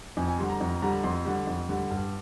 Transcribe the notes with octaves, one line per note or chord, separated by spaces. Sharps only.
F2 G#5
G#5
D3 G3 C6
A#5
F2 A#5
D3 G3 A#5
F2 C6
D3 G3
F2
D3 G3
G2